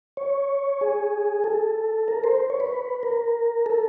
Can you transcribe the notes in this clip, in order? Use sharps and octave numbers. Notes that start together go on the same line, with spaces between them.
C#5
G#4
A4
A#4
C5
C#5
B4
A#4
A4